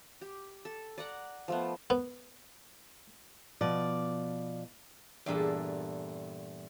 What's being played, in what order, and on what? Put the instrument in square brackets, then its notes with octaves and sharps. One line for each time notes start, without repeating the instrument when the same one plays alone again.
[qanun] G4
A4
D5 F#5 A#5
F3 A3 B3
[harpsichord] B3
[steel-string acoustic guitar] B2 F3 D5
[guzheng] E2 G2 A#2 A4